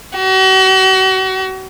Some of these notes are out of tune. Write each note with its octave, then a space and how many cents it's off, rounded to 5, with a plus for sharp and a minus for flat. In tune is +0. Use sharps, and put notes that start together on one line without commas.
F#4 +40